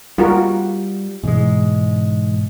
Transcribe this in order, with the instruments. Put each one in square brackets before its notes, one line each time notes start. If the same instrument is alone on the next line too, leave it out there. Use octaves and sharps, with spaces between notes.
[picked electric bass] G3 [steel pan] F4 F#4 A#4
[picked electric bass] G#2 G#3 [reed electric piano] B2 E3